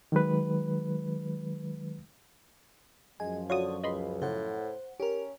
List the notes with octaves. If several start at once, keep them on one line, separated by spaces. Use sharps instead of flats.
D#3 F#3 G#3 B4
F#2 F3 G#3 G#5
D3 F4 F#4 C#5 D#6
C#2 D#5 B5 C6
A2 C#3 C5 F#5
C#4 G4 A#4